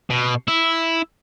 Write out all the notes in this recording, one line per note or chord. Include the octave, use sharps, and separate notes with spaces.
B2
E4